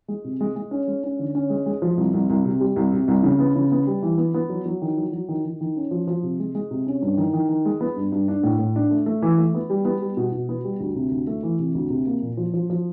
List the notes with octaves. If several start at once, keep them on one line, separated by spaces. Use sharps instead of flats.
G#3
C3
G#3
G#3
C#4
G#3
C#4
D3
C#4
G#3
G#3
F3
C2
C2
C2
C3
G3
C2
C3
C2
C#3
B3
C#3
B3
G3
E3
B3
B3
F#3
F#3
D#3
F#3
F#3
D#3
D#3
D#3
C#4
F3
F3
C3
G#3
G#3
C3
C#4
G2
D#3
D#3
D#3
G#3
B3
G2
G2
D4
A2
A2
D4
A3
A3
E3
A3
B3
G3
B3
G3
B2
B2
B3
G3
D2
C3
D2
A3
E3
C3
D2
C3
A#3
A#2
F3
F3
F3